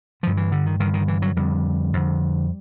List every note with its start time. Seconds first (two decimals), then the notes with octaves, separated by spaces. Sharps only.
0.23 G2 D3 F3
0.37 E3
0.52 D3
0.66 D#3
0.80 G2 D3 D#3
0.94 D#3
1.08 E3
1.22 F#3
1.36 F2 D3 G3
1.93 F2 D3